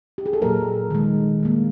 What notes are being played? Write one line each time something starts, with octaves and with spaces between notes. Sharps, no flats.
G4
G#4
A4
A#2 F#3 A#3 A#4
D#3 G#3
D#3 G3 A#3